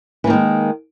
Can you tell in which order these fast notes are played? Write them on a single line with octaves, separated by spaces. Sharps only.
E3 A#3 D#3 G#3